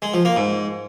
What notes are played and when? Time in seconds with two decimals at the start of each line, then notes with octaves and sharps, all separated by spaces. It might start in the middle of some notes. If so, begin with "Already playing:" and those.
0.02 G#3
0.14 F3
0.25 A#3
0.36 G#2